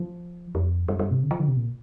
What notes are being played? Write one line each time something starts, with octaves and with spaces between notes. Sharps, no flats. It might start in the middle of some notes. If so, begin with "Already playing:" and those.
Already playing: F3
F2
G2
G2
C3
D3
F3
D3
C3
A#2